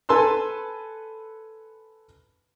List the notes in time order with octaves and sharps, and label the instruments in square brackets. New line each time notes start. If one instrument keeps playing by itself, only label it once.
[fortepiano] A4 B4 G#5 A5 C6 E6